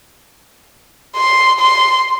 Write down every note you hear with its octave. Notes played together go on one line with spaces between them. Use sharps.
C6
C6